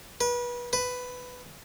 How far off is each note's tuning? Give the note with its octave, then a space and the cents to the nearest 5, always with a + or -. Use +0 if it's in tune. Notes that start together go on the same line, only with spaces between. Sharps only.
B4 -30
B4 +10